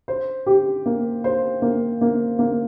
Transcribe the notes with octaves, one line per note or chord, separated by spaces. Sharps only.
C5
G4
A#3
C5
A#3
A#3
A#3